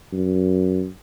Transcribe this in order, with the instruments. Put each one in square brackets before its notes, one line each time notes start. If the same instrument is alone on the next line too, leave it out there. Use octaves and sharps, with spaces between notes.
[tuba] F#2